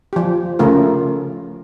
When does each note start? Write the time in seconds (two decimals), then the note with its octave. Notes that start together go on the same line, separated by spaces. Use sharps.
0.13 F3 G4
0.59 C#3 A3 F4 A#4